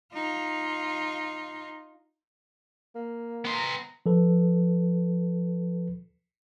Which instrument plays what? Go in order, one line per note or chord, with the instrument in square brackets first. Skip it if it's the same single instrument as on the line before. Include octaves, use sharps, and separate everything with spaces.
[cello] D#4 F4
[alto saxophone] A#3
[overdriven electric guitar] B3 C6 [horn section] C5 D#5 A#5
[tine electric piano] F3 A4 B4